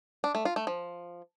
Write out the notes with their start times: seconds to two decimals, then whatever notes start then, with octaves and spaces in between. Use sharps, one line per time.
0.24 D4
0.35 A3
0.45 F4
0.56 A3
0.67 F3